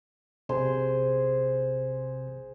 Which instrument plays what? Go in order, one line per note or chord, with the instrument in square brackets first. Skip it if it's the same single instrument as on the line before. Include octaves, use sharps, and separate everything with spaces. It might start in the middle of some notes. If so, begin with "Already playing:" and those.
[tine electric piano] A#1 C3 [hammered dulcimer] G#4 C5 C6